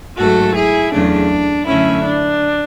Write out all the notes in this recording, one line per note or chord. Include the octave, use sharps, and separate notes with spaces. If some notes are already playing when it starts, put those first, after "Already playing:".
G#2 F#3 A3 F#4 A4
E4 G#4
E2 C#3 F#3 A3 D4
F#2 D3 A3 C#4 E4
D4